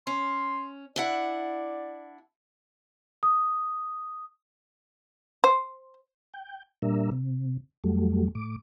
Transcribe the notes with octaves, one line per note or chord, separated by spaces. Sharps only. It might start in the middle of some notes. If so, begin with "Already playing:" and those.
C#4 C6
D4 E4 D5 F#5
D#6
C5
G5
A#2 G3 D4 A#4 E5
C3
F2 F#3 G3 A3
A2 D6